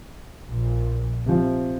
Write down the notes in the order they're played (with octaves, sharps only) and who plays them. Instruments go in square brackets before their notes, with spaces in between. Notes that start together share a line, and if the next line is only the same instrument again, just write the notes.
[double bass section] A#1 A#2
[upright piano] C3 F3